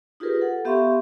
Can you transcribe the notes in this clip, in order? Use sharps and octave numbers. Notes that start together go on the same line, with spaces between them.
D#4 F4 G4 G#4 A#4 B4
A4 F#5
B3 G4 E5 F5 C6 C#6